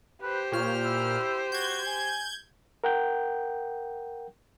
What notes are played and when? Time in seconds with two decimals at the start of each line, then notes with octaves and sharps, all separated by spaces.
0.23 G4 B4 C5
0.52 A#2 C#5 F6
0.84 E4
1.52 F#4 G6 G#6
1.87 G#5
2.84 A#4 F#5 G5 G6